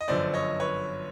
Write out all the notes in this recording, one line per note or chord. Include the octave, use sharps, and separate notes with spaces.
D#5
G1 F#2 D3 F3 C5 D5
C#5 D#5
B4 C#5